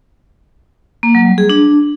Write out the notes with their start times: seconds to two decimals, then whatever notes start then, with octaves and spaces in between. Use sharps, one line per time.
1.03 A#3
1.15 F#3
1.26 G3
1.38 G#4
1.50 D4